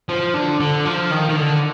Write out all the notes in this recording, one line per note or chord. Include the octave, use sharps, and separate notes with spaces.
F3
D3
D3
F3
D#3
D#3
D3